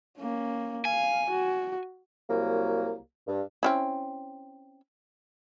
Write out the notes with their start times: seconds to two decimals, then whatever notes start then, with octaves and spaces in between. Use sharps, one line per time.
0.18 A#3 C#4
0.85 F5 G#5
1.30 F#4
2.29 C2 F#3 A#3
3.27 G2
3.63 C4 C#4 E4